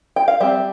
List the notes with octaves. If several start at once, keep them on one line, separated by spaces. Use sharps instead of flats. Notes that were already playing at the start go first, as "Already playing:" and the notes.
G5
F5
G3 C4 E5